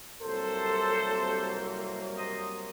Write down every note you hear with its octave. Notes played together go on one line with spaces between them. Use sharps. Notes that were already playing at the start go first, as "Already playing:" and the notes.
C2 C3 F#3 A#3 A4 C5
C5 D#5